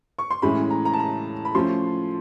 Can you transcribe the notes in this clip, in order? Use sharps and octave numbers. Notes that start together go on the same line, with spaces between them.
C#6
C6
A2 E3 G#3 C#4 B5
A#5
A#5
A5
A#5
B5
F3 A3 C#4 C6